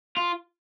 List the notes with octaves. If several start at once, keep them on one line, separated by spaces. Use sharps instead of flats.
F4